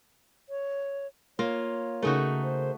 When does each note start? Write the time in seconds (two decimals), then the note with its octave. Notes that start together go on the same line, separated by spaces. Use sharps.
0.49 C#5
1.39 A#3 F4 C#5
2.02 C#3 A3 D#4 F#4 G#4 A#4
2.43 C5